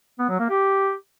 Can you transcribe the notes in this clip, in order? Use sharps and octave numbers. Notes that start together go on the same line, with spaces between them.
B3
F#3
A#3
G4